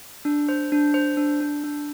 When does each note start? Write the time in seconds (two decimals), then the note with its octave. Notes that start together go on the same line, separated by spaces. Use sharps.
0.25 D4
0.49 C5
0.72 D4
0.94 C5
1.17 D4
1.41 D4
1.64 D4